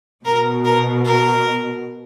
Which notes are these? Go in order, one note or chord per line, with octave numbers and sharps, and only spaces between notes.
B2 A#4
A#4
A#4